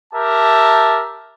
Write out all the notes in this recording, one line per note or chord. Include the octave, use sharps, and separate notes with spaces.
G4 A#4 E5 A5